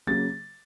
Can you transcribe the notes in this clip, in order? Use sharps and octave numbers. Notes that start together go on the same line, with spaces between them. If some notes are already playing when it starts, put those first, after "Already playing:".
C#3 F#3 A#3 A6